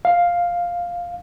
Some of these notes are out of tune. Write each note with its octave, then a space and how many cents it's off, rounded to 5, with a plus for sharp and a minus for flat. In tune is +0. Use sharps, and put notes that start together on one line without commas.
F5 +5